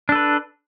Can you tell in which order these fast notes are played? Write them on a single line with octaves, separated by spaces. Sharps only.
D4 A4 B4